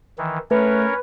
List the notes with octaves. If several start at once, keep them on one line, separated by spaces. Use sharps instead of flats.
D#3 E3
A3 C#4 A#4 B4 C#5